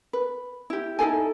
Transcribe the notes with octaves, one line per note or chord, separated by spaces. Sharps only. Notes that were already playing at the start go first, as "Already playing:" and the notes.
B4
E4 G4
D#4 E4 A4 G#5